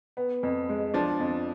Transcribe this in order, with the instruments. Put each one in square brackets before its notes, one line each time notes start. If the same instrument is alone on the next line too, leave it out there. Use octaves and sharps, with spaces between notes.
[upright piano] B3
F2
G#3
[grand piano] F3 [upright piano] D4
[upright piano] F2